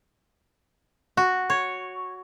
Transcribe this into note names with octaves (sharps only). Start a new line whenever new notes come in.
F#4
C#5